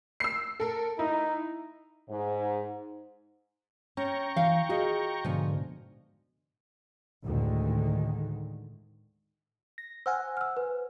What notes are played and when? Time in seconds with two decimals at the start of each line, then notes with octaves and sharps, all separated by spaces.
0.20 E6 C7
0.60 A4 A#4
0.99 D#4 E4
2.09 G#2
3.97 C#4 G5 A#5 C#6
4.36 E3 F5
4.69 F4 F#4 G#4 D#5
5.25 G#2 B2 D3 F3 G#5
7.24 D2 A2 D3 D#3 G#3
9.78 A#6
10.06 C5 F#5 G#5 E6 F6
10.37 E6 F6
10.57 B4